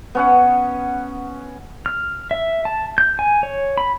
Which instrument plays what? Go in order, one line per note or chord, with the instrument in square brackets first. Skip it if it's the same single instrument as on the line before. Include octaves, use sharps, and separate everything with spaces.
[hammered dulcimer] B3 C#4 F#5
[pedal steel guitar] F6
E5
A5
G6
G#5
C#5
B5